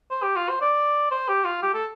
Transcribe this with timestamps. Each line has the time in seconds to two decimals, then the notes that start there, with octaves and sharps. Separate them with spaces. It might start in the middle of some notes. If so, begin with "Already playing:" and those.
0.11 C5
0.23 G4
0.36 F4
0.49 C5
0.61 D5
1.11 C5
1.28 G4
1.45 F4
1.62 G4
1.74 A4